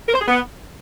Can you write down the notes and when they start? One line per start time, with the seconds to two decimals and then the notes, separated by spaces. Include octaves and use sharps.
0.07 A#4
0.14 C5
0.21 G#4
0.27 B3